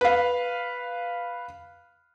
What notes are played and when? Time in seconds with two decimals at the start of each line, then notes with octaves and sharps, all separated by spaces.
0.01 B4 F5